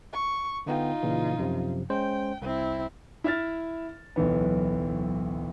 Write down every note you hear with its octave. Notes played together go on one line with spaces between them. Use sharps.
C#6
D3 B3 D#4 F4 G5
A#2 C#3 E3
F#2 C3 F3
G#3 C#4 C5 G5
C2 C4 E4
E4 E5 F6 A6
D1 B1 E3 B3